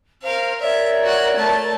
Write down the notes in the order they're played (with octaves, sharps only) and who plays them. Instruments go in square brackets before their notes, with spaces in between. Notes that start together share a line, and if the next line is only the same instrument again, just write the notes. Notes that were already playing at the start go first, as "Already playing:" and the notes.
[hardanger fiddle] A#4 F5 [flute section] C5
[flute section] A#4 C#5 D5 [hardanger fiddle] E5
[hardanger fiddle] F#4 F#5
A3 A5